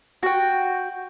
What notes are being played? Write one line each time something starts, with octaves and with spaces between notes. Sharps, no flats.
F#4 G5